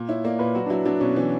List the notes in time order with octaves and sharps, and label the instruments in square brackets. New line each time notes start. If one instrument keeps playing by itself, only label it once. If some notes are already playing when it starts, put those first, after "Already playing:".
Already playing: [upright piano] A#2
[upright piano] E4 [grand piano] C#5
[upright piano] A#3 [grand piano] D5
[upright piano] A#2 [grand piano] B4
[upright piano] F#3 [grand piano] F#4
[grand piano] D4
[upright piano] F#3 [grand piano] E4
[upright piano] F#3 [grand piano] D4
[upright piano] B2 [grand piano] C#4
[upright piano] E3